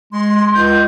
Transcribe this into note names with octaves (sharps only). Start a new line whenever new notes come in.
G#3 C6
C#2 G6